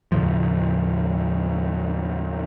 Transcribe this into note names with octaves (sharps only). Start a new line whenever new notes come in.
D#2 A2 C#3 F3